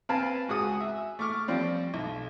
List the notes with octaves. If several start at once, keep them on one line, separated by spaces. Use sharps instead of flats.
C4 B4 F5 G#5 A5 B5
C#2 F#4 G#4 D#6
E5
A3 C#6 D6 F6
F3 G3 C4
B1